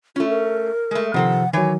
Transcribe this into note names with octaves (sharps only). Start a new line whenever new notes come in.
A3 C#4 F4
A#4
G#3 A3
C3 D#3 F3 C4 A4 F#5
D#3 E3 F#3 C#5 G#5